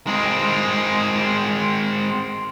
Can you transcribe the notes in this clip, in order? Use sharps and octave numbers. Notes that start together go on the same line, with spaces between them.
G#3 C4